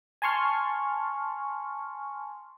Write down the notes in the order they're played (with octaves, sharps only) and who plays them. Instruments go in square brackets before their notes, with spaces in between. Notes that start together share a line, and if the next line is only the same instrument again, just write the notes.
[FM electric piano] G#5 A5 C6 C#6 F6